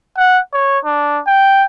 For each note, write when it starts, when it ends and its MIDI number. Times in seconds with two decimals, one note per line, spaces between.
0.18 0.39 78
0.53 0.79 73
0.85 1.19 62
1.27 1.65 79